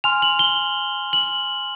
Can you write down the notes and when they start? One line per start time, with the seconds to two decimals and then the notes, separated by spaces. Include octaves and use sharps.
0.04 G#5 C6 F6 F7
0.22 F#7
0.39 G7
1.13 F#7